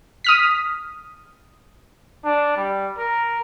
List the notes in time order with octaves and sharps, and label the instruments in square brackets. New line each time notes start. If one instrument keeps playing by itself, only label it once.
[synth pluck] D#6 F6 B6
[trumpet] D4
G3
A#4